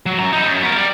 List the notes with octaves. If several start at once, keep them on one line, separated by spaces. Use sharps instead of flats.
F#3
F#2 A#5
D#4 E4
F#2
B3 A#4
G3